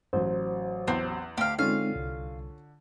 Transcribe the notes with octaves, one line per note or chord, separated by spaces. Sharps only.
A1 F#3 C5
E2 C4
D2 G4 F5
D3 G#3 C4 C#4 D#4 F4 F5
C2